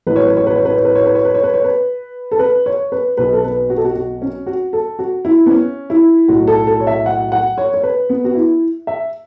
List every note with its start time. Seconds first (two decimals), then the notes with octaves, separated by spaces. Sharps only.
0.07 A1 A2 F#3 B4
0.16 C#5
0.26 B4
0.37 C#5
0.47 B4
0.56 C#5
0.65 B4
0.76 C#5
0.85 B4
0.95 C#5
1.06 B4
1.15 C#5
1.25 B4
1.34 C#5
1.44 B4
1.54 C#5
1.64 B4
2.32 A4
2.39 B4
2.66 C#5
2.92 B4
3.17 B1 B2 F#3 B4
3.33 A4
3.44 B4
3.70 F#4
3.77 A4
3.85 F#4
3.95 F#4
4.22 C#4
4.47 F#4
4.73 A4
4.99 F#4
5.25 E4
5.46 B3
5.50 C#4
5.90 E4
6.28 B1 A2 F#3 F#4
6.48 A4
6.67 A4
6.80 C#5
6.87 E5
7.06 F#5
7.32 F#5
7.58 C#5
7.74 C#5
7.83 B4
8.10 B3
8.24 F#4
8.35 E4
8.87 E5